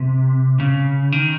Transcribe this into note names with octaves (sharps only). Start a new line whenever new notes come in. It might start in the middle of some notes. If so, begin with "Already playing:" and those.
Already playing: C3
C#3
D#3